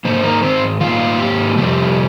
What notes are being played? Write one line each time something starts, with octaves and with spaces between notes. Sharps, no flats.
G#2 D#3 A#3 C5
A#3 A#4
C4 C5
G#2 D#3 A#3 F4 F5
G4
F2 C3 G3 G4